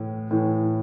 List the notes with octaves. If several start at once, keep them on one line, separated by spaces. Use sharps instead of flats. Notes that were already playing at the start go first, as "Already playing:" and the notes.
Already playing: A2 E3
A2 E3